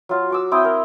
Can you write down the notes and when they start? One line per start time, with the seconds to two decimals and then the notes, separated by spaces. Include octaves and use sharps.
0.09 F#3 F4
0.30 F#4 D6 E6
0.52 C4 E4 G5 D#6
0.64 A#4